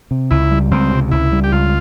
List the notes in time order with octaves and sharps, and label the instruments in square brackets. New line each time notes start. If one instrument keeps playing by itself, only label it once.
[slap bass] C3
[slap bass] C#2 [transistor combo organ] E4
[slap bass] G3
[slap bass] C#2 [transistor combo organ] C4
[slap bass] C3
[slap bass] C#2 [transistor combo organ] E4
[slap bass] G3
[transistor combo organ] G4
[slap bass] C#2 [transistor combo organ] F4